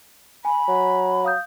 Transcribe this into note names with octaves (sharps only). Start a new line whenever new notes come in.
G#5 B5
F#3
F5 D#6 G6